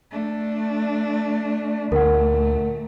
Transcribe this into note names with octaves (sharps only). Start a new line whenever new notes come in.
A3 D4
D2 A#2 A3 A#4 F#5